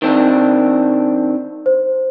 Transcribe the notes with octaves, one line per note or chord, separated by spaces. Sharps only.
D#3 C4 D4
C5